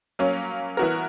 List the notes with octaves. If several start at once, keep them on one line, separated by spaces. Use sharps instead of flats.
F#3 A#3 C#4
E3 B3 F#4 A#4